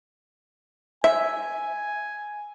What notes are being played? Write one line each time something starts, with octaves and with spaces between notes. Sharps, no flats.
E5 G#5